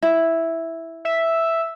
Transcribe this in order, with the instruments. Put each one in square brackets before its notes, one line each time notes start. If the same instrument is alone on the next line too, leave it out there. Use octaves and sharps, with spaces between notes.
[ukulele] E4
[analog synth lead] E5